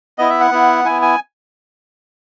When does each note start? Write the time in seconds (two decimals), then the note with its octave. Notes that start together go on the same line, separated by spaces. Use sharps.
0.18 B3 E4 D#5
0.30 E5
0.40 F#5
0.51 B3 E4
0.85 B3 E4 G#5
1.02 G#5